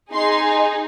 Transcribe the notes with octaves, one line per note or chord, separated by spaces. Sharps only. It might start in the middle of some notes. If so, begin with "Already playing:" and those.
D#4 G#4 C6